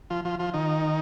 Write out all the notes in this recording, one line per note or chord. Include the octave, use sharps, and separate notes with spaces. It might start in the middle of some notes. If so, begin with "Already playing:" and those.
F3 F4
F3 F4
F3 F4
D#3 D#4